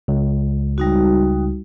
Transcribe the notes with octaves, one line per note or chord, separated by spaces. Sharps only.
C#2
G3 D#4 F#4